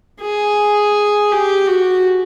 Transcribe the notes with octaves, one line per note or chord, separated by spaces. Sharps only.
G#4
G4
F#4